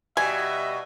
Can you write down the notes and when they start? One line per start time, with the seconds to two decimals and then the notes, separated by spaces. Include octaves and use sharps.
0.17 B2 G3 D#5 E5 G#5